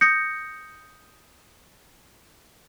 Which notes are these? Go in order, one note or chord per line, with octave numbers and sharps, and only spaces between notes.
D#6 G6 A#6 C#7